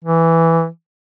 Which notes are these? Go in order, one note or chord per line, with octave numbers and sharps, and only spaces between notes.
E3